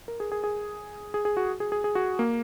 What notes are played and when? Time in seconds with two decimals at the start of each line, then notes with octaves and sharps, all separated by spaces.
0.08 A#4
0.20 G#4
0.32 G#4
0.44 G#4
1.14 G#4
1.25 G#4
1.37 F#4
1.60 G#4
1.72 G#4
1.84 G#4
1.95 F#4
2.19 A#3